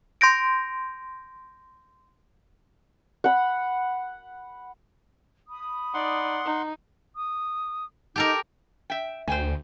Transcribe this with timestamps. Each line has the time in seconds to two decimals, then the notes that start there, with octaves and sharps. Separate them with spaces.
0.21 C6 G6 A#6 D7
3.24 F#5 B5
5.48 B5 D#6
5.94 D#4 D5 F#5 C6
6.45 D#4
7.16 D#6
8.16 D#4 G4 A4 A#4
8.90 E5 G5
9.28 D2 C5 G5 G#5